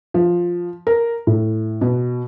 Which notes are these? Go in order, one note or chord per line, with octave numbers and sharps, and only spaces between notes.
F3
A#4
A2
B2